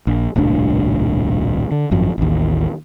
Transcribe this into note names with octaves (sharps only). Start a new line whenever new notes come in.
A#1
D#1 C2 A2 D4
D3
G#1 F#2 F3
A1 D#2